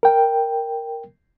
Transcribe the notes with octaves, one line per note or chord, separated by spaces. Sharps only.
A#4 G5